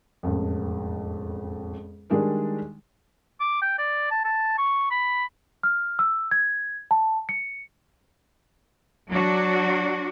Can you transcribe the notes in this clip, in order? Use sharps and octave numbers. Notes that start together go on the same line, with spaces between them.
E1 A1 F2
D#3 G3 G#3 D4 G#4 A#4
D6
G5
D5
A5
A5
C#6
B5
F6
E6
G#6
A5
C#7
F#3 D4 F#4